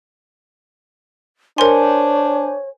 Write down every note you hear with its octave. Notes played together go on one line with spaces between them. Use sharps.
D4 A#4 C5 C#5 G#5 C6